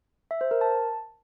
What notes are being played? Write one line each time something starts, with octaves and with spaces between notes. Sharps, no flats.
E5
C5
A#4
A5